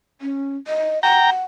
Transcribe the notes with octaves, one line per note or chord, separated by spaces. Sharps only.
C#4
D#5
F#5 G5 A#5